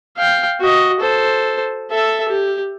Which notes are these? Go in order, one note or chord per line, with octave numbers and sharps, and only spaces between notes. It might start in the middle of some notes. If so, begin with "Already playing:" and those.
F5 G5
F#4 D#5
A4 C5
A4 E5
G4